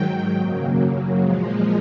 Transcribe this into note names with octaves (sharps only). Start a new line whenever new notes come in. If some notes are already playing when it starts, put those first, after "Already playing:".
Already playing: G#2 D#3 F#3 G5
F#2 C#3 F#3 A#3
A#2 F3 G#3